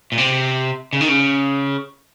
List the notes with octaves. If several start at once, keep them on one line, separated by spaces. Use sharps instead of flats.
A#2
C3
C#3
D#3
C#3